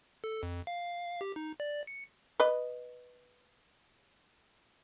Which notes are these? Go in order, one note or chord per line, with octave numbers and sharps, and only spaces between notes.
A4
F2
F5
G4
D#4
D5
C#7
B4 D#5